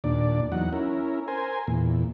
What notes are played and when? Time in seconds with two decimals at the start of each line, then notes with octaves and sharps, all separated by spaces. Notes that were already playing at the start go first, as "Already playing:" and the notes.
0.04 D#2 A#2 D4 D5
0.52 E2 F#3 D#4 F#5
0.73 C#4 E4 A#4
1.28 A#4 C5 G#5
1.67 E2 A#2